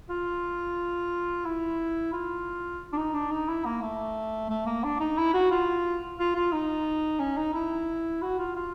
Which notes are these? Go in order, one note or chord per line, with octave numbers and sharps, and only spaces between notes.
F4
E4
F4
D4
D#4
D4
D#4
E4
A#3
A3
A3
A#3
D4
D#4
E4
F#4
F4
F4
F4
D#4
C#4
D#4
E4
F#4
F4
F4